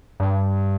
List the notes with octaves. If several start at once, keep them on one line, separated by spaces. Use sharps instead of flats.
G2